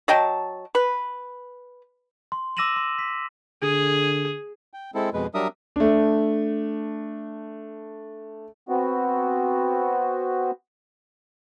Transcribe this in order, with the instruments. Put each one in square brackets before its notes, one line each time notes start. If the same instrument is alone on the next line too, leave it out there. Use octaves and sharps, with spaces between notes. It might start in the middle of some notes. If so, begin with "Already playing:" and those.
[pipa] F#3 D#5 G5 A5
B4
[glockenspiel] C6
D6 E6 A#6 D#7 E7 F#7
C6
B6
[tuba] D3 [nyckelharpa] G#4
[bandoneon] G5
G#3 C4 E4 A4
F2 B2 G#3 B4
F#3 G3 D4 A#4 E5 D#6
[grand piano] A3 D4
[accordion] B3 C4 F#4